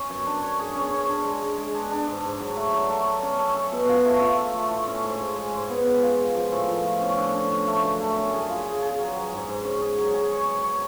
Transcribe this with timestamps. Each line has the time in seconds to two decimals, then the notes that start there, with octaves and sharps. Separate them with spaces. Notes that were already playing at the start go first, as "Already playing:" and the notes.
Already playing: C#4
0.10 F#2
0.26 D4
0.42 C#5
0.59 G#4
0.75 C#4
0.92 C#5
1.09 D4
1.24 G#3
1.42 G#3
1.58 G#3
1.74 D4
1.91 D4
2.07 G#2
2.24 G#2
2.40 F#3
2.57 A3
2.73 F#3
2.90 A3
3.06 A4
3.22 C#4
3.39 A4
3.56 A4
3.72 B2
3.88 F4
4.05 A3
4.22 F4
4.38 A3
4.54 A3
4.71 A2
4.87 C#4
5.04 G#2
5.20 G#3
5.36 G#3
5.53 G#2
5.69 B3
5.86 G#3
6.02 F4
6.19 G#3
6.35 F3
6.52 A2
6.68 F3
6.85 A2
7.01 C#4
7.17 D3
7.34 C#4
7.50 D3
7.67 A3
7.84 F#2
8.00 A3
8.17 C#4
8.33 G#4
8.49 F4
8.66 G#4
8.82 G#4
8.99 F#3
9.15 F#3
9.32 G#2
9.48 G#2
9.64 C#4
9.81 G#4
9.98 F#3
10.14 G#4
10.31 C#5
10.47 C#5
10.63 C#5